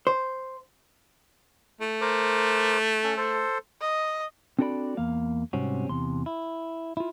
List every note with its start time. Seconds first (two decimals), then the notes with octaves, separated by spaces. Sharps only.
0.07 C5
1.81 A3
2.01 A#4 C5 D6
3.04 C#4 A4
3.17 A4 C5
3.81 D#5
4.59 C4 D4 F#4 A4 D5 B5
4.97 E2 A#3 F5
5.53 G#2 C3 G3 C4 C#4 F#4
5.89 E2 C3 C6
6.26 E4
6.97 E4 F4